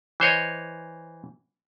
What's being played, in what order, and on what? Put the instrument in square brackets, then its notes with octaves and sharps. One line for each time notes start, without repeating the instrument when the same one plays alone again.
[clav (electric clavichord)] E3 C5 C#5 D#5